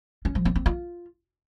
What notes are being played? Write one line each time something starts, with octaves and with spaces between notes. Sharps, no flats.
C#4
F3
C4
C4
F4